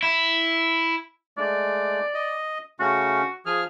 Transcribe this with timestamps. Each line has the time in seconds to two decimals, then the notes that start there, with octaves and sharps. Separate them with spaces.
0.03 E4
1.38 G#3 A3 D5
2.14 D#5
2.80 C#3 A3 C#4 F#4
3.46 F3 G#4 F6